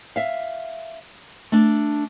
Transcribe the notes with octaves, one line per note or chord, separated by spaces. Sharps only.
E5 F5
A3 D4